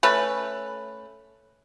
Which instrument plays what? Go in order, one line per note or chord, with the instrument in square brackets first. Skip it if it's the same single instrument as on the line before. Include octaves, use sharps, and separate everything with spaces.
[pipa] A3 C#4 B4